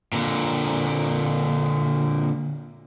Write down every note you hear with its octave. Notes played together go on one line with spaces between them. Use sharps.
A#2 D3